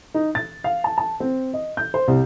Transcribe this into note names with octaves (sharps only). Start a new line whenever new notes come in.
D#4
A6
F5
A5
A5
C4
D#5
G6
C5
C2